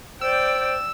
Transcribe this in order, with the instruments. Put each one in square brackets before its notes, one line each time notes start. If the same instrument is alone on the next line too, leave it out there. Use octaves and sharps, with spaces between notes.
[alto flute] C5 [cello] D5 G5 [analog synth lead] E6